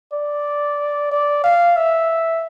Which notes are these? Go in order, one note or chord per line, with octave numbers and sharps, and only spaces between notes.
D5
D5
F5
E5